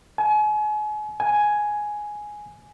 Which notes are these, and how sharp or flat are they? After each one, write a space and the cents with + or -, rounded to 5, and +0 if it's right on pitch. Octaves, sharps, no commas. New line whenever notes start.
G#5 +35
G#5 +5